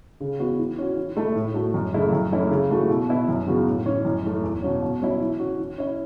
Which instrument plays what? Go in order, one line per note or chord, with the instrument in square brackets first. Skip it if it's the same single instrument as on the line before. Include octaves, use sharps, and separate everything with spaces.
[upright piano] C#3
E3 B3 F#4
E3
C#4 F#4
E3
A3 E4
A2
A3 F#4
F#2
C#3 A3 E4
F#2
E3 A3 C#4 E4
C#3
E3 A3 F#4
B2
B3 E4
F#2
C#3 E3 B3 F#4
A2
E3 C#4
F#2
E3 A3
E2
B2 F#3 C#4
B2
F#3 C#4 E4
E3
C#4 F#4
E3
C#4 E4